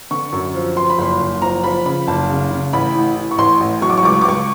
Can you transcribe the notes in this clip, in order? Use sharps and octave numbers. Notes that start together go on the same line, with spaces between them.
D3 C#6
F#2
F3
F3 C6
B5
F#1 C6
F#1
F3 A#5
F3 B5
C#3 B5
F#1 A5
C#3
C#3
A1 B5
A2
A2
C#6
A1 C6
A1
F#3 C#6
D6
C#6
C#2 D6
C#6
D6
C#2 C#6